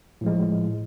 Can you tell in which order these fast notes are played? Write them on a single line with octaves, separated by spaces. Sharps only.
A2 F3 G#3